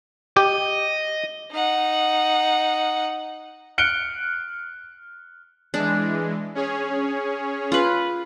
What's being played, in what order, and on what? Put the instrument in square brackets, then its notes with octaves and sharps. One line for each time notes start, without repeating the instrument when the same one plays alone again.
[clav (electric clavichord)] G4 [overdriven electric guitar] D#5
[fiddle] D#4 F#5
[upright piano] F6 F#6 C#7 D7 G7
[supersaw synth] E3 G#3 [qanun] D4
[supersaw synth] C#4 G#4 C#5
[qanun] F4 B4